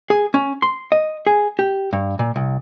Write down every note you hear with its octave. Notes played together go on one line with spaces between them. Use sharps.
G#4
C#4
C6
D#5
G#4
G4
G2
A#2
C2